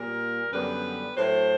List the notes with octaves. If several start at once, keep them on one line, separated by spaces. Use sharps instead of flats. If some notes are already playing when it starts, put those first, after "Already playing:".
Already playing: A#2 G3 A#3 A#4
F#2 D3 G3 B3 B4
A2 F#3 A3 C5